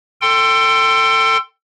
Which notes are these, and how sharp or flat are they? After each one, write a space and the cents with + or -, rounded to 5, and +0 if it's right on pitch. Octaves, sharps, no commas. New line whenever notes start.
A4 +25 G5 +0 C6 +0